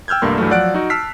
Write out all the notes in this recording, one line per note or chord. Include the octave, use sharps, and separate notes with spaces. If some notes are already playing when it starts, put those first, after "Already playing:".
G5 E6 F6 G6 G#6
C2 G2 A3 A#3 C6
G2 E3 F#3 A3
F3 F#3 D5 F#5 F#6 D7
D#4 F#4
A5 E6 F6 B6 C7